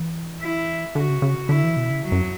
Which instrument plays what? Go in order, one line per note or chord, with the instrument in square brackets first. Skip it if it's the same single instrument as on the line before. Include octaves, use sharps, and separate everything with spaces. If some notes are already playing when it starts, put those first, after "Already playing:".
Already playing: [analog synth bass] E3
[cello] E4
[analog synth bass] D3 [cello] F#4
[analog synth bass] C#3
C#3
[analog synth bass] D3 [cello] E4
[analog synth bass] E3
B2
C#3
[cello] F#3
[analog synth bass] F#2